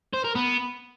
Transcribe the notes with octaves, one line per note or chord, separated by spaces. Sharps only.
C5
A#4
B3